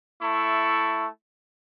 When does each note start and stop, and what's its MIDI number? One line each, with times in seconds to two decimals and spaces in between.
0.22 1.08 57
0.22 1.08 64
0.22 1.08 81
0.22 1.08 85